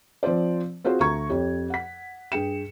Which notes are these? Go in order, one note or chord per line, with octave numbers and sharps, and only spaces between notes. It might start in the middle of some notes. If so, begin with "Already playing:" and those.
F3 C4 F4 C5 D5
C4 F4 F#4 G#4 C5
D2 A#5 C#6 G#6
F2 G4 C#5
F#5 B6
G2 G#4 G5 C#7 E7